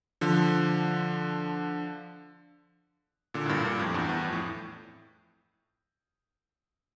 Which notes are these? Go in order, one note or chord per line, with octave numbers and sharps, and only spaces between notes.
D3 F3
A#2 D3
A2
G2 A#2
G2 A#2
F2 A2
E2 G2
E2
F2
A2